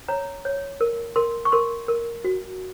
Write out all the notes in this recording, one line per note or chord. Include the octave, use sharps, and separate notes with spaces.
C#5 A#5
C#5
A#4
A#4 C6
C#6
A#4 C6
A#4
F#4